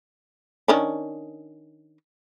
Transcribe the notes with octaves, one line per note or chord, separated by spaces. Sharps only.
D#3 C#4 D4